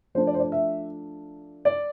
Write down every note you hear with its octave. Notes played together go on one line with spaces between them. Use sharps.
F3 A3 D4 C5
D5
C5
D5
E5
D5